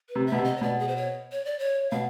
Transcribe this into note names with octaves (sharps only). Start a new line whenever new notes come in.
B4
C3
E5
B2
C3
D#5
C#5
B2 D5
G#4
C5
C#5
C#5
D5
C#5
B2 F5